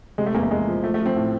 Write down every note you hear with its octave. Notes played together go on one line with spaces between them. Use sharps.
C3 G#3
A3
E2 A#3
A3
E2 G#3
F3
F3 A3
A3
F3
C4
A2